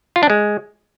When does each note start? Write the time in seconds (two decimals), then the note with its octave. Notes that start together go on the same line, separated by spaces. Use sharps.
0.16 F4
0.23 D4
0.30 G#3